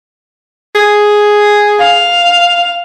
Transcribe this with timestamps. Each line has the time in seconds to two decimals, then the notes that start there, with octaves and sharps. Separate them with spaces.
0.75 G#4
1.79 F5